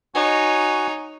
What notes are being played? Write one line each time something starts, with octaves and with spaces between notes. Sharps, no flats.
D#4 F#4 C#5 G#5